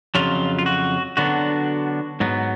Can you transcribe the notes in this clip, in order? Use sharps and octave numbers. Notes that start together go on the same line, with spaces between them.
F2 C#3 F#3 F4
F4
F#4
D3 F#3 B3 D4 F#4
G#2 F#3 B3